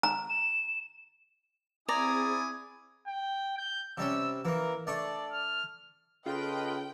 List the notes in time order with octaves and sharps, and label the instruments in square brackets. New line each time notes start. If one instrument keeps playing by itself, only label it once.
[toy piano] A#5
[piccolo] E7
[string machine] C4 G#4 [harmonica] E4 G#5 D#6 [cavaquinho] D5 A#5
[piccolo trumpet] G5
G6
[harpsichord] C3 G3 C#4 [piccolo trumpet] E6
[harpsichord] E3 A#3 [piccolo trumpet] A#4
[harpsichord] A3 D4 C#6 [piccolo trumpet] D5
[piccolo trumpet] F6
[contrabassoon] C#3 [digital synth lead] F4 [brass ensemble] A4 B4 D#5 [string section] G5